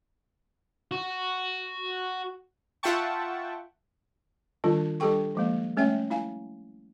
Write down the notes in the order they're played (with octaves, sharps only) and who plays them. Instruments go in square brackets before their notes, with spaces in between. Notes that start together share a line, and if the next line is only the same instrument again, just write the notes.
[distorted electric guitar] F#4
[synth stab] F4 E5 F#5 G5 A5 C#6
[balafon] D#3 G3 D4 F4
G3 D4 G4 A4 G5 C#6
F3 G#3 A#3
G3 A3 C#4 C#5 E5 G5
E4 F5 G#5